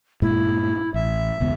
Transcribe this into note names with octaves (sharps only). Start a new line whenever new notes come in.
G2 A#2 G#3 E4
A1 E5
E1 C#2 B3